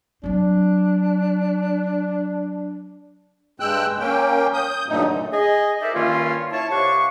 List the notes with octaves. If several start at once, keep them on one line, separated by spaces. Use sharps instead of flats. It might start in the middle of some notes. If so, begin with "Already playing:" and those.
F#3 C4 D4
G2 G#3 G5 E6 F#6
A#3 C#4 G5
D#6 G6
G2 A#2 D3 F#3 A3 D#4
G#4 D#5
D#4 A4 A#4 C5 D5 E5
G2 D#3 A#3 C#4 E4 F4
E4 C#5 A5
C2 G4 F5 F#5 C#6